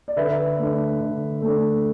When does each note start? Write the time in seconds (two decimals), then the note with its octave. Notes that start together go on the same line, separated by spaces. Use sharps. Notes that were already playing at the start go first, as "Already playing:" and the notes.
0.08 D5
0.16 D3 B4 E5
0.58 A3 D4
1.01 D3
1.42 A3 D4